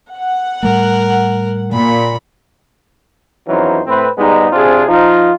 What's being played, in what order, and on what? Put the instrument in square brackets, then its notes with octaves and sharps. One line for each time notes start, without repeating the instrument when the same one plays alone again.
[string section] F#5
[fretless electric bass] A2 G3 A3 [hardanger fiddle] A#4
[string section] A#2 [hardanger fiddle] B5
[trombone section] F2 E3 F#3 C#4 D#4 C5
A2 C4 B4
G#2 G3 G#3 B3 D#4
C3 C4 D4 F4 G#4
F3 D#4 F4